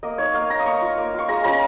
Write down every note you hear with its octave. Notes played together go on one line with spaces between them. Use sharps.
A#3 D#5
D#4 C#5
A#3 F5
D#4 A#5
D#6
A#3 C#6
F4
A#3
F4 C#6
G#3 A#5
C#4 F4 A#5